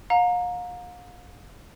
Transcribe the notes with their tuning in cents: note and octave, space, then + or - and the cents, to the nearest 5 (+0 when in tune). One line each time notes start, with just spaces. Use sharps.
F5 +40 A#5 +0